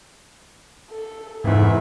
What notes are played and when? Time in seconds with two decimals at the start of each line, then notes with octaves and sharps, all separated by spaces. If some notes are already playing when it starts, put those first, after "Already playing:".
0.90 A4
1.44 F1 E2 G#2 B4 E5